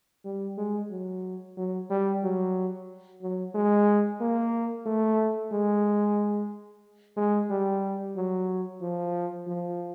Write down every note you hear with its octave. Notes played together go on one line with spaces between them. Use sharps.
G3
G#3
F#3
F#3
G3
F#3
F#3
G#3
A#3
A3
G#3
G#3
G3
F#3
F3
F3